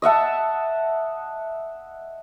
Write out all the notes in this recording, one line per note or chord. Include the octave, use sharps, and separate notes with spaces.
D#5 E5 F#5 A5